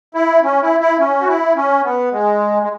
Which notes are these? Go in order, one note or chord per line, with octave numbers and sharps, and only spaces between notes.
E4
C#4
E4
E4
C#4
F#4
E4
C#4
B3
G#3
G#3